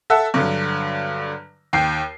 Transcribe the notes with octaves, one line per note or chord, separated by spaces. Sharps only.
A4 E5 F#5 A5
G2 D3 F#3
D#2 G5 C7